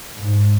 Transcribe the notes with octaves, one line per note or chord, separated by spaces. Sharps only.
G#2